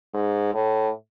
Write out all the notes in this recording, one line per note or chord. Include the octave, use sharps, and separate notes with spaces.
G#2
A2